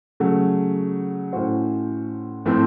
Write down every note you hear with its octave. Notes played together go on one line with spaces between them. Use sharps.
C#3 F#3 A3
A2 A3 C#4 F#4 C5
A2 F3 A3 C4